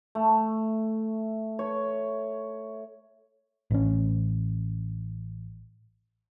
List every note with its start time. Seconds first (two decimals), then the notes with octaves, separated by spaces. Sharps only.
0.15 A3
1.59 C#5
3.71 A1 C#4